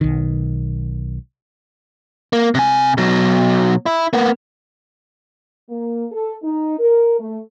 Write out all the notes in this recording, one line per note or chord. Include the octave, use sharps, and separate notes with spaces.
B1 D#3
A#3
C3 G#5
B2 F#3
E4
A#3 B3
A#3
A4
D#4
A#4
A3